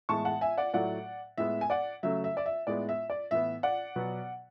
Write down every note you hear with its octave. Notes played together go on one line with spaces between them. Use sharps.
A2 E3 G#3 B3 A5 C#6
F#5 A5
E5 G#5
D5 F#5
A2 F#3 A3 D5 F#5
A2 G#3 B3 E5
G#5
D5 F#5
C#3 F#3 A3 E5
E5
D5
E5
A2 G#3 B3 D5
E5
D5
A2 E3 B3 E5
D5 F#5
B2 F#3 B3